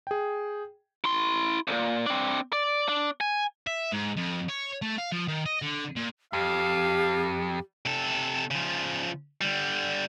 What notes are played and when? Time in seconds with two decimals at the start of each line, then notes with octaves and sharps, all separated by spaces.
0.07 G#4 G5
1.04 E4 C6
1.68 C2 A#2
2.06 C4 D4
2.53 D5
2.88 D4
3.21 G#5
3.67 E5
3.92 G#2
4.17 F2
4.49 C#5
4.82 A3
4.98 F5
5.12 F3
5.28 D#3
5.46 D#5
5.62 D3
5.96 A#2
6.33 F2 G4 F5
7.86 C3 A4
8.51 C#3 F3
9.41 D3 G3